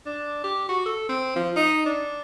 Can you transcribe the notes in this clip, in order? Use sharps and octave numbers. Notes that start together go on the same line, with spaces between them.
D4
G4
F#4
A4
C4
F3
D#4
D4